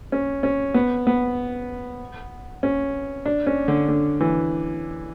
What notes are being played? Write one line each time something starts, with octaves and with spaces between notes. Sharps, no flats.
C#4
C#4
B3
B3
C#4
D4
C#4
D3
D3
E3